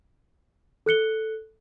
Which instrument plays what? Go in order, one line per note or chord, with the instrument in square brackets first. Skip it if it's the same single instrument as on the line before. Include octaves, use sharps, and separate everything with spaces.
[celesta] A4 F#6 C#7 G7